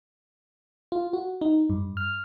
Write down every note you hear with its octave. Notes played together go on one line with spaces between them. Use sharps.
F4
F#4
D#4
G2
F6